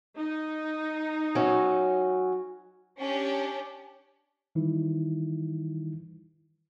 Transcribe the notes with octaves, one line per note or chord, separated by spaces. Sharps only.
D#4
F#3 C#4
C#4 D4 G4
D#3 E3 G3 D#4 E4